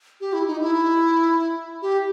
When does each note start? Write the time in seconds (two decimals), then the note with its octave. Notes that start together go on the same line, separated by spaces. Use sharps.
0.21 G4
0.33 E4
0.47 D#4
0.61 E4
1.82 G4